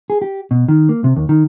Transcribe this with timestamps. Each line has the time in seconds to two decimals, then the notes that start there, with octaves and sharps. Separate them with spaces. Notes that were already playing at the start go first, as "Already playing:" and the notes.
0.10 G#4
0.22 G4
0.51 B2
0.68 D#3
0.89 A#3
1.04 C3
1.16 D#2
1.29 D#3